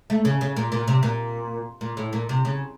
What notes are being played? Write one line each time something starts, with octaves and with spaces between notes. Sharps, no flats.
A3
C#3
C#3
A#2
A#2
C3
A#2
A#2
A2
A#2
C3
C#3